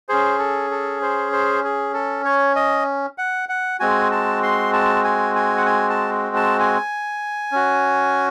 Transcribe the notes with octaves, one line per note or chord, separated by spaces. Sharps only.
C#4 G#4 C5
A4
A4
C5
C5
G#4
A4
C#5
D#5
F#5
F#5
G#3 C4 F#4 G#5
A5
C6
A5
G#5
G#5
F#5
G#5
A5
A5
G#5
C#4 F#4